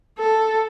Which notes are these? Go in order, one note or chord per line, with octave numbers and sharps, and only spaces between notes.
A4